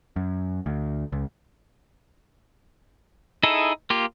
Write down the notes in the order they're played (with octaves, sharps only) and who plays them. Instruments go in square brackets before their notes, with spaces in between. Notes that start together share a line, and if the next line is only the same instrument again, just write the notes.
[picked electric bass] F#2
D2
C#2
[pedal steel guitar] D#4 E4 G#4 A4
A#3 F4 G4